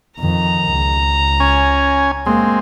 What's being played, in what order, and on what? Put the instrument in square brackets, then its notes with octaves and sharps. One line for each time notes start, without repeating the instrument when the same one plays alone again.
[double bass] F2 D#3 [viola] A#5
[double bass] C#2
[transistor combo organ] C#4 G#5
[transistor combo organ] G#3 C4 [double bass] A#3